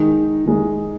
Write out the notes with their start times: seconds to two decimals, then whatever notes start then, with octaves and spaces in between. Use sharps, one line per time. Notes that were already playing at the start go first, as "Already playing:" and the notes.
Already playing: D#3 G#3 D#4
0.46 D#3 G#3 D#4